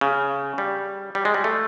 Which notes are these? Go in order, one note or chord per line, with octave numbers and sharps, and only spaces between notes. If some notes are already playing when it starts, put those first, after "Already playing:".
C#3
G3
G3
G#3
G3
A3